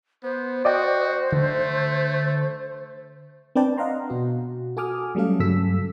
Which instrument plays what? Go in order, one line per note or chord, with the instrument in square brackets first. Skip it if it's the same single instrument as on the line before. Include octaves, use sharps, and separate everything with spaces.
[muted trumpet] B3 [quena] C5
[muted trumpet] F#4 [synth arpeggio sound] D5 D#5 G5
[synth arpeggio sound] D3 [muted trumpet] A3
[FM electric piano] C4 D4 B4 D5 G5 A5
D#5 F5 F#5 A#5 C6
B2 F#4
F#4 A4 G#5 D6 D#6 F6
F#3 G3 A3 C#4 A4 F5
G2 C#3 F#3 A4 E6 B6